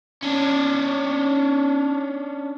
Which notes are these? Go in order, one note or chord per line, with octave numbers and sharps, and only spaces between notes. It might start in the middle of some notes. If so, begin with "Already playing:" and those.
C#4 D4